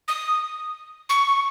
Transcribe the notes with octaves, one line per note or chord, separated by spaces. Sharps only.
D#6
C#6